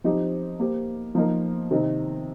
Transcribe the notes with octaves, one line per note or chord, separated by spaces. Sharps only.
F3 C4 D#4 G4 C5
A#3 G4 C5
F3 A#3 D#4 A#4
C3 D#3 C4 D#4